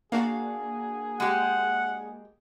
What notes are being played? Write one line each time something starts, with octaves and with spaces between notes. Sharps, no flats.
A#3 D4 F#4 G#4 F5
G#3 G4 F#5